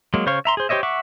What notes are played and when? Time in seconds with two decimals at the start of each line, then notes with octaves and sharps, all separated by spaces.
0.14 F#3 G#3 A#3
0.26 C#3 C5 C#5 F5 C#6
0.45 E5 A#5 C6
0.57 G#4 C5
0.69 G4 C5 C#5 D#5 E5
0.83 E5 F#5 C#6 D6